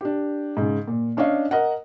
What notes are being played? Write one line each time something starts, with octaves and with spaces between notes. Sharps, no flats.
D4 G4
G#2 C#3
A#2
C#4 D4 C#5 D#5 F5
A#4 D#5 F#5